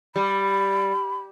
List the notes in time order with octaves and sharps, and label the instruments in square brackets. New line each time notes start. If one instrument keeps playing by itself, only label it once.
[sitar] G3 [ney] B5